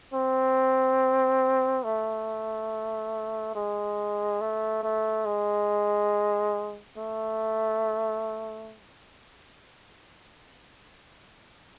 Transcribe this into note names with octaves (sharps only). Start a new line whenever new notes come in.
C4
A3
G#3
A3
A3
G#3
A3